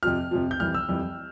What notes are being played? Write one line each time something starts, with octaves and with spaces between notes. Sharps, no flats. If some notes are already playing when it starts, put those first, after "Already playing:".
F2 C3 F3 F6
F2 C3 F3
G6
F2 E3 G3 F6
E6
F2 E3 G3